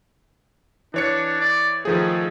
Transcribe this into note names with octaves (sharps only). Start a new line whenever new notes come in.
E3 D4 C#5 C#7
D5
D#3 F3 A3 G#4